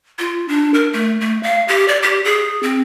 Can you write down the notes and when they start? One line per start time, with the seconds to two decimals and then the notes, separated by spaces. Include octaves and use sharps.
0.19 F4
0.48 D4
0.74 A#4
0.93 A3
1.20 A3
1.43 F5
1.68 G4
1.88 D5
2.02 G4
2.25 G#4
2.63 C4